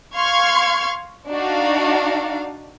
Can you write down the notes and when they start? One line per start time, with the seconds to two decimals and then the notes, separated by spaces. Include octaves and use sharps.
0.14 F5 C6 C#6 F6 G#6
1.30 D4 D#4 F#4 F5